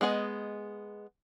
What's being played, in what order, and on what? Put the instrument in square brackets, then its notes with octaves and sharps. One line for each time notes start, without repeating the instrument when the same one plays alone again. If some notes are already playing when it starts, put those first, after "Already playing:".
[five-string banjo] G#3 B3 G#4 D#5